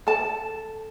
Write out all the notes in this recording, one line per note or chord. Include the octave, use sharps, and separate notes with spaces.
A4 A5